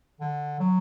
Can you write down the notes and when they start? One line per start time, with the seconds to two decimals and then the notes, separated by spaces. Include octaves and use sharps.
0.21 D3
0.60 F#3